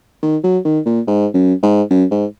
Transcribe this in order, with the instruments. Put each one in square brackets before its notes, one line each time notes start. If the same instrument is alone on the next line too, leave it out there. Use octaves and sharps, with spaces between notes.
[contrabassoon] D#3
F#3
D#3
A#2
G#2
F#2
G#2
F#2
G#2